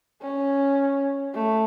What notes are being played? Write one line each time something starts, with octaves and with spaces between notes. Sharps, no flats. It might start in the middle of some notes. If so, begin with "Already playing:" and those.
C#4
A3